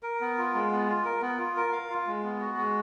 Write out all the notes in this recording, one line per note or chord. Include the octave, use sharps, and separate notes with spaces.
A#4
B3
F4
G#3
B3
F4
A#4
B3
F4
A#4
F5
F4
G#3
B3
F#4
G#3